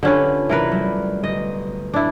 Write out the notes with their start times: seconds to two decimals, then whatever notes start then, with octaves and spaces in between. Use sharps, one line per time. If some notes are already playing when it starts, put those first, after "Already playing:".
0.03 D3 C#4 F4 G4 B4 A5
0.49 D2 C3 E3 A#4 B4
0.72 F#3 G3
1.24 G1 D#5
1.94 D4 E4